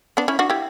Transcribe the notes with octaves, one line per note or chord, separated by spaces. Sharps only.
B3 D4
C#4 E4
D4 F#4
E4 G4